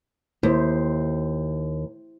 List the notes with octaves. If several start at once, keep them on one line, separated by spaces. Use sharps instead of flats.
D#2 E4 C5